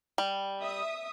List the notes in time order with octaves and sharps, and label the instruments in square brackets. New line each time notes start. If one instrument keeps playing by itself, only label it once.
[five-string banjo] G3
[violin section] E5 D#6